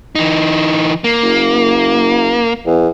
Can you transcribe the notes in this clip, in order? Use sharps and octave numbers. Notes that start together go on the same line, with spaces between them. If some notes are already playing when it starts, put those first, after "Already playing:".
E3 D#4
A#3
F#1
E2